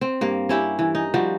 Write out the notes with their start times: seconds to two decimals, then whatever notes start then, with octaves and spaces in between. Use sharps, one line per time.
0.01 C4
0.21 G2 A#3
0.49 C#4 E4 G4
0.79 E3
0.95 D#4
1.14 F3 G3 F#4